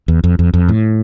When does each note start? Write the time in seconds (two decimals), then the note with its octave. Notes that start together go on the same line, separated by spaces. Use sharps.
0.08 E2
0.24 F2
0.39 F2
0.54 F2
0.69 A2